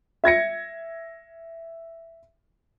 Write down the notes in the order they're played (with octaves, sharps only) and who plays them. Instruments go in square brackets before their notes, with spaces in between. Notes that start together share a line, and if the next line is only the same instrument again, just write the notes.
[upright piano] E5 G#6 A#6 C#7